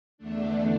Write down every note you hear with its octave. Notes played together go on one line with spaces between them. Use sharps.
E2 D3 A3 D4